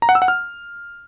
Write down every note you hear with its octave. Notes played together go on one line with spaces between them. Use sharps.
A#5
F#5
E6
F#5
F6